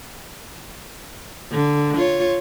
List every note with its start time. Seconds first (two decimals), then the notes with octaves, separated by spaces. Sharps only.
1.51 D3
1.96 F4 C#5